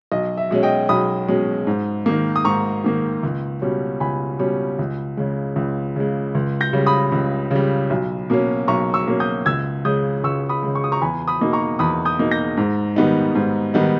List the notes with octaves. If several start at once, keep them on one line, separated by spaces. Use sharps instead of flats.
B1 D#5
E5
B2 G#3 C#4
D#5 G5
B1 B5 D#6
B2 G#3 C#4
G#2
D#3 A#3
D#6
G#2 A#5 C#6
D#3 A#3
C#2
B2 G3 C#4
C#2 G#5 B5
B2 G3 C#4
C#2
C#3 G#3
C#2
C#3 G#3
C#2
G6 A#6
C#3 G3
B5 D#6
C#2
C#3 G3
B1
B2 A#3 C#4
B1 A#5 C#6
C#6 E6
B2 A#3 C#4
D#6 G6
C#2 E6 G#6
C#3 G#3 D#6 G6
C#2 C#6 E6
B5 D#6
C#3 G#3
C#6
D#6
A#5 C#6
E2 G#5 B5
B5 D#6
B2 A#3 D#4
A#5 C#6
E2 B5 D#6
D#6 G6
B2 A#3 D#4
G6 A#6
G#2
D#3 G3 B3 D#4
G#2
D#3 G3 B3 D#4